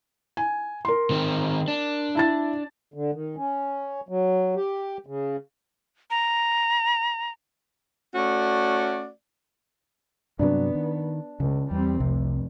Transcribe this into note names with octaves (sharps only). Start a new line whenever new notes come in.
G#5
A#4 C6
D#3 C4
D4
E4 A5 A6
D3
D#3
C#4
F#3
G4
C#3
A#5
A3 C#4 F#4 D5
G2 C3 F#3 B3 D4
D#3
C#2 C#3
E2 G3 C4
F1 C2 C3